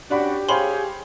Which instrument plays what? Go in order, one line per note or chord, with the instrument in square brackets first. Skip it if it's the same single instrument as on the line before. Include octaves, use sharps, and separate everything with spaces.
[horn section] C#4 D4 F#4 [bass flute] G4 [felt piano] D5 F#5 B5
[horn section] G#4 G5 G#5 [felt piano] C5 C#5 F5 [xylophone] B5 C6